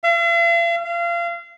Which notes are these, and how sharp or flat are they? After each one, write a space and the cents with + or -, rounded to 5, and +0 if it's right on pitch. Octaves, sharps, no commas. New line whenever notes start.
F5 -45
F5 -30